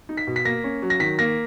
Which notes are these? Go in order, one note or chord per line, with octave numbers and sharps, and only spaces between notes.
D#4
B6
B2
B6
A#3 A#6
C#4
F#3
A#6
D#3 B6
A#3 A#6